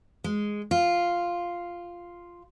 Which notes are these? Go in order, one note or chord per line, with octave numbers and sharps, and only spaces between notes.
G#3
F4